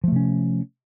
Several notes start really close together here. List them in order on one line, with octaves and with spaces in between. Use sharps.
F3 A3 C3 C#4